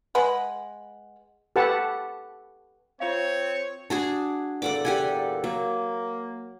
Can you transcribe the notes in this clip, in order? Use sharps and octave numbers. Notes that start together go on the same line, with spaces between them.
G#3 B4 F#5
G4 A4 B4 F#5 A5
C4 F4 C#5 F5
D4 F#4 G#4
E2 A#2 A4 D5 F#5 D6
G4 F#5 G#5
F#3 A#3